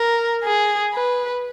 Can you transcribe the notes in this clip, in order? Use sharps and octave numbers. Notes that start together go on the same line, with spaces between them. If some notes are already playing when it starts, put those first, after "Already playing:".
Already playing: A#4
G#4
B4